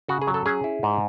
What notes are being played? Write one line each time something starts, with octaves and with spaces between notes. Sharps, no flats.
C#3 F#4
G#4
F#3
A4
C#4 G#4
E4
G#2